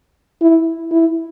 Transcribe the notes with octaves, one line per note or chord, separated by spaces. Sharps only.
E4
E4